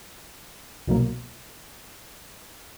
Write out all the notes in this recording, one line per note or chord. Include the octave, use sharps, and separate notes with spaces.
C2 B2 F#3 A#3